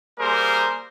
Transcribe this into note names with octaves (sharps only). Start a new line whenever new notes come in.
G3 A#3 G#4 A#4 C5